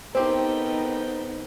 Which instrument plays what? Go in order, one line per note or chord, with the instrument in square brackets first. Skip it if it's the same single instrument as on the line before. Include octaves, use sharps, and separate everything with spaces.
[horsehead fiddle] B3 D#4 [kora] C4 G4 [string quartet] A4 A#4 G5 [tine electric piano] C5